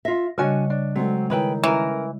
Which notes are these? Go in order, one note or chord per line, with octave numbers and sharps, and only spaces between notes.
F4 E5 A#6
C#3 G3 D4 F#4 C#5 D#5 G#5
D4
F#3 G#3 C4 A4
D#3 E4 G#4 B4 C#5 D#5 G5
E3 C#4 A#4